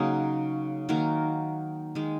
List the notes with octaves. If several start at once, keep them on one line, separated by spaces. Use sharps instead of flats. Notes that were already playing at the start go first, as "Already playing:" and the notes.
Already playing: C#3 F#3 A#3 D#4 F#4 G#4
D#3 F#3 A#3 F#4 A#4
D#3 G#3